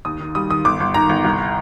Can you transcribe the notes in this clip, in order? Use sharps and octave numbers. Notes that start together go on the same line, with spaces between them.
D#2 D#6
D#3
G3 D#6
D#3 D#6
G1 D6
G1
D#3 A#5
G1
C2